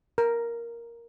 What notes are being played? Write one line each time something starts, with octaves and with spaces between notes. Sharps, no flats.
A#4